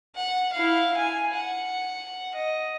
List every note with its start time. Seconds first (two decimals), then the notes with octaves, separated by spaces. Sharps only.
0.16 F#5
0.53 E4 F5
0.98 G#5
1.34 F#5
2.35 D#5